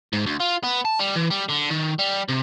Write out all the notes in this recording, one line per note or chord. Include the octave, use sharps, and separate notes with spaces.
G#2
D2
F4
B3
A5
G3
E3
G3
D3
D#3
G3
C3